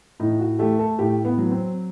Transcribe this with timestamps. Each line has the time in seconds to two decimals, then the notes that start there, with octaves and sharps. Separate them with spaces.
0.20 A2 D#4
0.39 F#4
0.59 A3 G4
0.79 A4
0.99 A2 G4
1.25 B3
1.38 F#3
1.51 C4